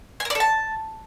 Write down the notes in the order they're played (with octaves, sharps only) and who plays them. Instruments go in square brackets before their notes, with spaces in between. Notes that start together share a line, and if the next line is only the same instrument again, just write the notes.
[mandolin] G#5
A#4
D5
A4
A5